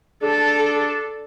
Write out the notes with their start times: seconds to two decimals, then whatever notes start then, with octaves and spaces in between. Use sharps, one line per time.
0.23 D4 A4